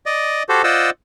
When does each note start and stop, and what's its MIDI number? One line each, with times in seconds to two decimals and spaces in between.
0.06 0.43 74
0.06 0.43 75
0.49 0.62 66
0.49 0.62 67
0.49 0.62 69
0.49 0.62 72
0.64 0.90 65
0.64 0.90 72
0.64 0.90 74
0.64 0.90 75
0.64 0.90 78
0.64 0.90 88